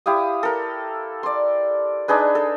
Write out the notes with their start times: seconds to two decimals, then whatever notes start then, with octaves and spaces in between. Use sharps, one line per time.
0.06 E4 G4 F5 D#6
0.43 A4 A#4
1.23 D5 C6
2.08 D4 D#4 G#4 B4
2.35 A4